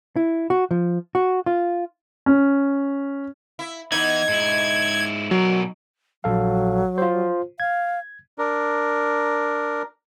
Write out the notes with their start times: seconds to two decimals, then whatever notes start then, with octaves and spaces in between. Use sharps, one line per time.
0.16 E4
0.50 F#4
0.71 F3
1.15 F#4
1.46 F4
2.26 C#4
3.59 E4
3.92 E3 B3 D#4 G#6
4.29 G#2 E4
5.31 B2 F#3 A#4
6.24 A#1 F#3 A4 F5
6.98 F4 C5
7.60 F5 G#6
8.38 D4 A#4